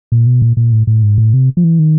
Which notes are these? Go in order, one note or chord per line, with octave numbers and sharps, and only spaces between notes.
A#2
B2
A#2
A#2
A2
A2
G#2
A2
C3
F3
E3
D#3